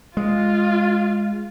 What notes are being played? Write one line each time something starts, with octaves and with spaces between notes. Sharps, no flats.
G#3 F4